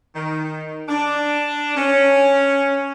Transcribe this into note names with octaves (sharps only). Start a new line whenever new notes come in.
D#3
D4
C#4